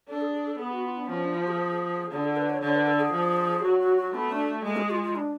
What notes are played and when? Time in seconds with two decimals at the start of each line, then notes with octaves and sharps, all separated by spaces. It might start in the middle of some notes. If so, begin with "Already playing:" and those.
0.09 D4 A4
0.21 G#4
0.34 G#4
0.47 A4
0.59 B3 G#4
0.72 F#4
0.85 F4
0.97 D4
1.04 B3
1.09 F3 C#4
1.22 D4
1.35 F4
1.47 G#4
2.11 D3 G#4
2.24 A4
2.36 B4
2.49 C#5
2.61 D3 C#5
2.75 B4
2.87 A4
3.00 G#4
3.12 F3
3.63 F#3 F#4
3.79 F#4
3.97 F#4
4.14 A3 B3
4.31 D4
4.64 G#3 A3
4.77 G#4
4.90 F4
5.03 F4
5.16 D4